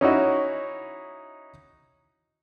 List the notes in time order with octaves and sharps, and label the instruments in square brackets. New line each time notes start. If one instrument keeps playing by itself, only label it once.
[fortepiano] C#4 D#4 E4 F#4